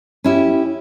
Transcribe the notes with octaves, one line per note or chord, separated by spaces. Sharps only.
C#4 E4 G4